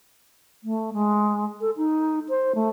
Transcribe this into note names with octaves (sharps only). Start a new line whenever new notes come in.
A3
G#3
A4
D#4
C5
A3